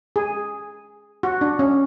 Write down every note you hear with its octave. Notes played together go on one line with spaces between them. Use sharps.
G#4
F#4
D4
C#4